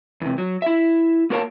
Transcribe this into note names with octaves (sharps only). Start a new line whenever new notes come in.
E2 C3
F#3
E4 E5
A#3 F#4 A#4 C#5 F5 A5